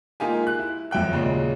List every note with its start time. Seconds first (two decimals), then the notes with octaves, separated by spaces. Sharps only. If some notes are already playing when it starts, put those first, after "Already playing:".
0.20 G#3 A#3 D#4 F4 G4 G#5
0.47 F#6
0.59 E4
0.91 F1 F#2 E5 G5 F#6
1.11 D#2 A#2 C#3 F#3 G#3